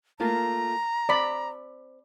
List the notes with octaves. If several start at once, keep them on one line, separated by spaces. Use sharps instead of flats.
A3 A#3 F4 A#5
C4 D5 B5